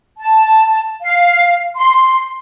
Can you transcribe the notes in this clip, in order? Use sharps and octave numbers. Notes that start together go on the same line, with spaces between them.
A5
F5
C6